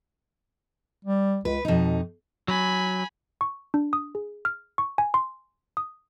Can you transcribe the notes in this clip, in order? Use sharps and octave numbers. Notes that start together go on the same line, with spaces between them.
G3
C#2 B4
F2 B2 D#4
F#3 G#5 B5
C#6
D4
D#6
G#4
F6
C#6
G#5
C6
D#6